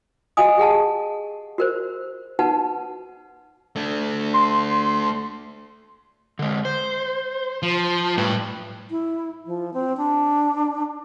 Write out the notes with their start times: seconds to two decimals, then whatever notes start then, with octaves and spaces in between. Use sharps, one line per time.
0.37 F#4 D#5 F5 G#5 D#6
0.58 G4 G#4 F#5 A5
1.58 F#4 A#4 C5
2.39 D#4 F#4 B4 F#5 A5
3.76 A3 D4
4.34 C6
6.39 D3 G#3
6.65 C5
7.63 F3
8.18 A2 G3 B4
8.91 E4
9.46 F3
9.74 C4
9.97 D4